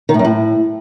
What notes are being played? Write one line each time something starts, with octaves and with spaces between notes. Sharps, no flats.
D#3
A2
F#2
A2